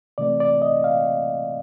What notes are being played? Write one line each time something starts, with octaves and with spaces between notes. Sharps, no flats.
C3 E3 A3 C4 D5
D5
D#5
F5